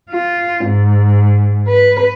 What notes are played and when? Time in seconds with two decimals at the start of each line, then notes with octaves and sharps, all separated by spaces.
0.10 F4
0.65 G#2
1.68 B4